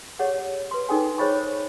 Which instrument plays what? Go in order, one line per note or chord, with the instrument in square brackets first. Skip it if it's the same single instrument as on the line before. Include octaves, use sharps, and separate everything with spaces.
[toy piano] G4 G#4 C#5 D#5 F#5
B4 C6
D#4 G#4 A4 G5 G#5 C6
G#4 C5 C#5 D#5 B5 C#6